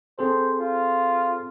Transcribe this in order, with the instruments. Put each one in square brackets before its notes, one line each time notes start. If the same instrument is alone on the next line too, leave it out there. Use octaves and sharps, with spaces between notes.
[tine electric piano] C4 G#4 A4 [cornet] C5
[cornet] F4